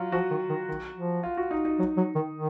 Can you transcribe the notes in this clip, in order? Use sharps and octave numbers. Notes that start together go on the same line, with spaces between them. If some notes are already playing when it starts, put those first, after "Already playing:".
Already playing: F#3 F4
F3 F#4
D#3
D#3
D#3
F3
F4
F#4
D#4
D#4
F#3
F#3
D#3
D#3